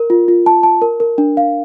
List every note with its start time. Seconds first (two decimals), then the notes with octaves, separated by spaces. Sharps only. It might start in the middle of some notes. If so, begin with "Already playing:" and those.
Already playing: A#4
0.10 F4
0.28 F4
0.46 A5
0.63 A5
0.82 A#4
1.00 A#4
1.18 D4
1.37 F5